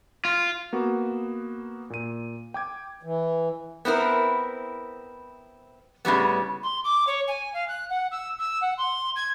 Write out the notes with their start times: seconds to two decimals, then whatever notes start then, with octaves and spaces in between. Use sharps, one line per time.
0.25 F4
0.73 A#3 B3 F#4
1.90 A#2 D#7
2.54 G5 D6 G#6
3.03 E3
3.85 B3 C4 E4 A#4
6.05 A2 C#3 G3 B3
6.63 C6
6.84 D6
7.07 C#5
7.28 G#5
7.54 F5
7.68 F#6
7.89 F#5
8.11 E6
8.39 E6
8.61 F#5
8.78 C6
9.16 G#6